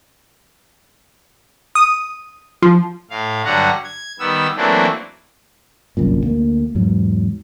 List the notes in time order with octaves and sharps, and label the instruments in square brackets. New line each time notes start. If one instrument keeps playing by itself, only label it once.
[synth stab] D#6
F3
[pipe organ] A2 F5
G2 D3 F#3 G3 F#5 A#5
G#6
D#3 G3 B3 E6
E3 F#3 A3 A#3 C4 D4
[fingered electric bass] G1 C2 F#2 A#2
D2 A#3
E2 G#2 F#3